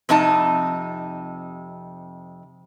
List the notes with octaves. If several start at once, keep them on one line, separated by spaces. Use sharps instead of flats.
F2 C3 D#4 A5